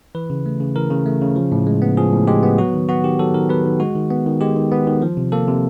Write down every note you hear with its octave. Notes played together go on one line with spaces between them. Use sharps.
E3 B4
C#3
A3
C#3
E3 A#4
C#3
A3
C#3
F3
A2
G#3
B3
F3 G#4
A2
G#3 G4
B3
F#3 F#4
D#3
B3 F#4
D#3 G4
F#3 A4
D#3 A#4
B3 B4
D#3
G#3 F#4
D#3
B3
D#3
G#3 G4
D#3
B3
D#3
F3
C3
A#3 A4
C3